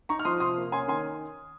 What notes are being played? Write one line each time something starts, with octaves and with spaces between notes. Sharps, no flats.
D#4 A#5 C#6
F6
F3 C6 D#6
C3 C6 D#6
A#3
C#4 G#5 C6
D#3 G#5 C6